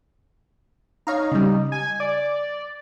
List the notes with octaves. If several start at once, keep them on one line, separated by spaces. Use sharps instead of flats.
D#4 C#5 F5 A#5
C#3 G3
G#5
D5